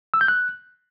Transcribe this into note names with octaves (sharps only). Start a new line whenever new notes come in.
E6
G6
F#6